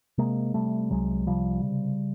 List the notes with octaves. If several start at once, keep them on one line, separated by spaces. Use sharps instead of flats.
C3 G#3 A#3
C3 G3 A3
C2 F#3 G#3
C3 F3 G3
C#3